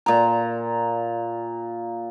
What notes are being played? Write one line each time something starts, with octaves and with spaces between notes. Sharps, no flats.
A#2 A#5